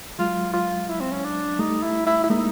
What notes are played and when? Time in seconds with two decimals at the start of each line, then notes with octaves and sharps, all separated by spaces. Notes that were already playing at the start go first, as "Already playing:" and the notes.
0.19 F#3 G#3 F4
0.53 F4
0.89 E4
1.01 C4
1.12 C#4
1.25 D4
1.59 G3 A3 D#4
1.83 E4
2.07 E4
2.24 E4
2.30 G#3 A#3 D#4